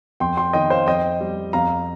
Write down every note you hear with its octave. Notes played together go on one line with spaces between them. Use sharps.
F2 G5 C6
G5 C6
D#3 D#5 G5
C5 F5
F2 D#5 G5
G3
F2 F5 A#5